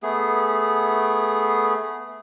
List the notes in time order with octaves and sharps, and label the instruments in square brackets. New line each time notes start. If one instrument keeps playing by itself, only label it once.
[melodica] A3 B3 G#4